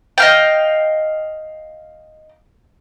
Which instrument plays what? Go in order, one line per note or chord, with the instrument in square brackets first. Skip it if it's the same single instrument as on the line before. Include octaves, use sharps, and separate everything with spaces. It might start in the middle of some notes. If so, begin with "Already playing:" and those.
[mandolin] D#5 F5 G5